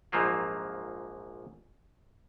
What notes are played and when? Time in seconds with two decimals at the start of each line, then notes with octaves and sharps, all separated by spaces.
0.12 A#1 G#2 F3 F#3 A#3 F4